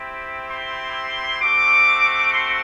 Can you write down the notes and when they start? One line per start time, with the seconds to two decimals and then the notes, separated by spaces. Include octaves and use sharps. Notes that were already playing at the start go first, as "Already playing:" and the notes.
Already playing: C4 E4 G4
0.50 C6
1.41 A3 C4 F#4 D6
2.31 C6